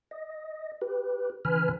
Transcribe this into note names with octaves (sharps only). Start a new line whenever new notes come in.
D#5
G4 B4
C#3 E3 B4 G#5 B5 F6